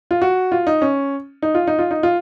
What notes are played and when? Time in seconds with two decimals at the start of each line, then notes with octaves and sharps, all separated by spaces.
0.11 F4
0.22 F#4
0.52 F4
0.67 D#4
0.82 C#4
1.42 D#4
1.55 F4
1.67 D#4
1.79 F4
1.91 D#4
2.03 F4